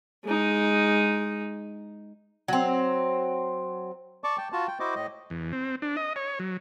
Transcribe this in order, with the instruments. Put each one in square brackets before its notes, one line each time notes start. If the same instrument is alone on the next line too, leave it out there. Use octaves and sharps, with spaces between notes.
[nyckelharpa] G#3 D#4
[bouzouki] F#3 C4
[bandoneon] D5 A5 C#6 D6
G5 A5
F4 F#4 A5
G5
E4 F#4 C5 D#5 D6
A2 D#5
[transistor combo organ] E2
C4
D4
D#5
C#5
F#3